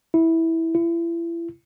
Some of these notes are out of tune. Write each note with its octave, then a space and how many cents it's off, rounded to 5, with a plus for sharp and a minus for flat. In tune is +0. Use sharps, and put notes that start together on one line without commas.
E4 -10
E4 +35